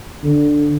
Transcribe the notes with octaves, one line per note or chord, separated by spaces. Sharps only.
D3